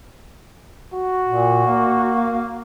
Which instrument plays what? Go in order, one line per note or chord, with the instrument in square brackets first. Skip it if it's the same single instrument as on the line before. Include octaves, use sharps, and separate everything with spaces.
[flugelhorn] F#4
[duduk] A#2
A#3